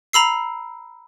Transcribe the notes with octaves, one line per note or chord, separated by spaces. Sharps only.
A#5 B5 E6 C7